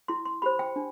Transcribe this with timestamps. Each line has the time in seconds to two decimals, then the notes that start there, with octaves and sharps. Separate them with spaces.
0.08 E4 C6
0.25 C6
0.42 G4 C5 B5
0.59 G5
0.76 D4